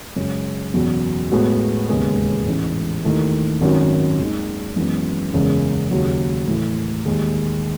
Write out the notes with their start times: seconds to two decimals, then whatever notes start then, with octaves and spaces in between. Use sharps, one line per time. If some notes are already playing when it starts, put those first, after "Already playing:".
0.16 F#2 C#3 G#3 C#4
0.74 F#1 E2 B2 F#3
1.31 A2 G#3 B3 F#4
1.88 E1 D#2 C#3 G#3 B3
2.46 A1 G#2 E3 G#3
3.04 D#2 D#3 A3 E4
3.61 G#1 F#2 D#3 F#3 C#4
4.19 D#2 D#3 G#3 D#4
4.76 F#2 E3 G#3 B3
5.33 F#1 E2 C#3 G#3
5.91 D#2 C#3 F#3
6.48 A2 E3 A3 E4
7.06 D#2 D#3 G#3